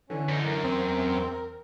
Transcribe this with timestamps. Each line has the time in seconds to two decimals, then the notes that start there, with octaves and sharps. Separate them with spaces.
0.10 D3 E3 C#4
0.29 F#2 D#4
0.45 F#2 A#4
0.63 E2 C4